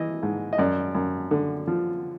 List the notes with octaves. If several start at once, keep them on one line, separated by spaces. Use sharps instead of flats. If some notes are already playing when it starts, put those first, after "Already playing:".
Already playing: E3 D#5
G#2
D#5
F#2 D5
F#2
D3
F3